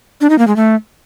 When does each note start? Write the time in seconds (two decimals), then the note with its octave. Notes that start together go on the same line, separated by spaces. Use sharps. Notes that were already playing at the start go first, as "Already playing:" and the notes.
0.21 D4
0.30 D#4
0.39 A#3
0.47 G#3
0.56 A3